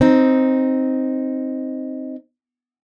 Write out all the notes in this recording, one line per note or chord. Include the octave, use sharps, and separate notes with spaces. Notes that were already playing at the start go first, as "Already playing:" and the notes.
C4 D#4